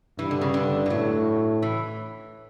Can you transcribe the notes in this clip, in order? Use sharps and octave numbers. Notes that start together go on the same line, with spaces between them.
G2 E3
D3
C#3
D3
E3
A2 F#3
E3